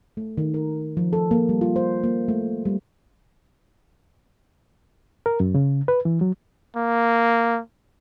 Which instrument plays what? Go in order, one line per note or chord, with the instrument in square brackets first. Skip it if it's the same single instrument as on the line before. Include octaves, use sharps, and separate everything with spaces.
[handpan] A3
D#3
A#4
F3
A4
A#3
G3
F4
C5
A#3
A3
G3
[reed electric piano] A#4
F#2
C#3
B4
E3
F#3
[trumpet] A#3